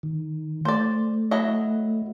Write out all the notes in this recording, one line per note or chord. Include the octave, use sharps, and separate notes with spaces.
D#3
A3 C5 D5
F#3 E4 D#5